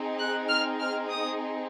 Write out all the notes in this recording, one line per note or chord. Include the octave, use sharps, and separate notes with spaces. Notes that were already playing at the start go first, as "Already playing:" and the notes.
Already playing: C4 D#4 G#4
F#6
F6
F6
D#6